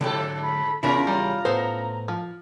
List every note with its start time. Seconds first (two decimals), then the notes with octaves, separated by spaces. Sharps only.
0.01 G#2 D3 F#3 G4 A4
0.43 B5
0.83 E2 C#3 C#4 E4 F4 A#4 B5
1.07 G3 A#5
1.45 A2 B3 A4 C5
2.08 F3